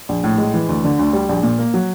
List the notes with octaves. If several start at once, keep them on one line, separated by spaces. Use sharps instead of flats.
A#1
A2
G#3
E3
D2
D3
D2
G3
A#1
A#2
A#3
F#3